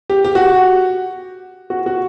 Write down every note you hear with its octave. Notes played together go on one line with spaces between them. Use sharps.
G4
G4
F#4
F#4
F#4